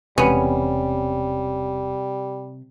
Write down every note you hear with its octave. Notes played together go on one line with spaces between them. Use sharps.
E1 C3 G3 B3 C#4